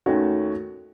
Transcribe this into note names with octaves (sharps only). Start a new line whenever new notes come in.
D#2 D#3 A3 C#4 F#4